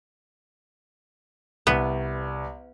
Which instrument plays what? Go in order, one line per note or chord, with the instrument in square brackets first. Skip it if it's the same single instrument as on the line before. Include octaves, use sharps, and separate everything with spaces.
[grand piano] C2 [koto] B3